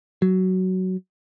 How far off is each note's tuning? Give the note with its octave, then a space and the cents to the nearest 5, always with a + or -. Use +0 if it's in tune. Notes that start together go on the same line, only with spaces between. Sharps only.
F#3 +10